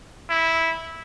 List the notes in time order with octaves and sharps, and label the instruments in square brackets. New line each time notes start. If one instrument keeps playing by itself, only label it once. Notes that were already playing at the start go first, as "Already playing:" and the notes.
[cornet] E4